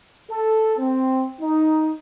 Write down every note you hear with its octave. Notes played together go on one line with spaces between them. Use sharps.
A4
C4
D#4